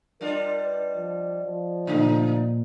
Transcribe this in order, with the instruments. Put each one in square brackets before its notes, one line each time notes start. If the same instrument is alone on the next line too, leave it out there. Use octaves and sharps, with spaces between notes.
[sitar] G3 D4 F4 [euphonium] A#4 [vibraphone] D5 D#5
[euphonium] B4
F3
F3
[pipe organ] A#2 [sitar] C#3 A3 D#4